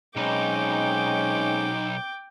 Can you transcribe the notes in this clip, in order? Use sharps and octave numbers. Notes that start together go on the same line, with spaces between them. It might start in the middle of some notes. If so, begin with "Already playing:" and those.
B1 G#3 C4 C#4 D#4 G5 D6